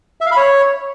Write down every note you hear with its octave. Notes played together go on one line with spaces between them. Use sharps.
E5
F5
B5
C#5